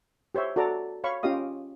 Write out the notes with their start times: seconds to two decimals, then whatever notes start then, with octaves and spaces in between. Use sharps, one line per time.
0.35 G4 C5 C#5 E5
0.56 F#4 A4 D5 A#5
1.04 C#5 F5 B5 C#6
1.23 C#4 F4 G4 D#5 F5 D#6